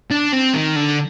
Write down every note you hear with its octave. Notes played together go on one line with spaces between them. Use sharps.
D4
C4
D#3
D3